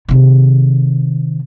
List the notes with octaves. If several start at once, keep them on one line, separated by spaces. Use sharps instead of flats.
C3 D#3